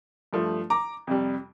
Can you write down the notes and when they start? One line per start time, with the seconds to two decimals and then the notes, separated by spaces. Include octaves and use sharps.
0.33 G2 F3 A3
0.70 A#5 D6
1.07 F2 C3 G3